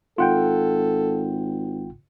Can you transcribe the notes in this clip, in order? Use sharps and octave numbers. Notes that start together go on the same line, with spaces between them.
G#1 F4 A4 F#5 G5